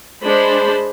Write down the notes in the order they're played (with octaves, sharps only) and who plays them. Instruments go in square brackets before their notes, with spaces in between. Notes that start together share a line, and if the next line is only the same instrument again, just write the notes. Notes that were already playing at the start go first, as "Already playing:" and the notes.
[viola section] G#3 D4 C5 B5